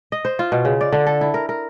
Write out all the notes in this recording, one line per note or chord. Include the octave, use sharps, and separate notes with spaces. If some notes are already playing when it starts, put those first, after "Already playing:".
D#5
C5
F4
B2
C#3
D5
D3
A4
E4
A#4
A#4